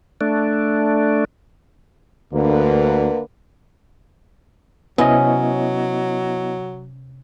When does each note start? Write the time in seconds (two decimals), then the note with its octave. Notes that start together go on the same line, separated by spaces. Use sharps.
0.21 A3 D4
2.33 D2 D3 A#3 B4
4.98 C3 F#3 B3 C#4 E4 D#5